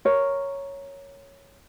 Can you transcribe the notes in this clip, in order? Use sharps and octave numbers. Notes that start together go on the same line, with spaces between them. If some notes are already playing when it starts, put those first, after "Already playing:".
A#4 C#5